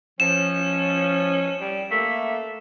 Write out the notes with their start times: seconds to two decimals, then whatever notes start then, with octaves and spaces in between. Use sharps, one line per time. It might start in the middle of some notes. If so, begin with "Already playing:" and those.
0.20 F3 C#4 E7
1.60 G3
1.91 A3 A#3 E5